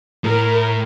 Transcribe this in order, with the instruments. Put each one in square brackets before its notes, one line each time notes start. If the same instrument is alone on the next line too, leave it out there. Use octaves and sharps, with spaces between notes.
[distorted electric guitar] A2 [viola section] A#4